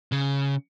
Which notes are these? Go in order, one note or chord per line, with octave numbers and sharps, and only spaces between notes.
C#3